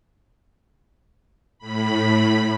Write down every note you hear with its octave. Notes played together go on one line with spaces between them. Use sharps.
A2 B5